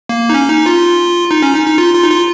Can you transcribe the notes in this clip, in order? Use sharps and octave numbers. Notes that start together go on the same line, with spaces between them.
A#3
D#4
C#4
D#4
F4
D#4
C#4
D#4
D#4
F4
F4
D#4
F4